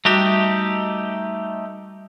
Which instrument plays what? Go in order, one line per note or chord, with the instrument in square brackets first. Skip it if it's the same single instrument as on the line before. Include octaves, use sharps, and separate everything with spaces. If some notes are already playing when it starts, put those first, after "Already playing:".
[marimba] G3 F#4 E5 [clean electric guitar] A3 D#4 G4